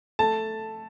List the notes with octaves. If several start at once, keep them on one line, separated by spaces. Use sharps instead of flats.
A3 A5